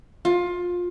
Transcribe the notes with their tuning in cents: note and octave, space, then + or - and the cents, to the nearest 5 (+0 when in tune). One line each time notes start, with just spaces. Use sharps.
F4 +20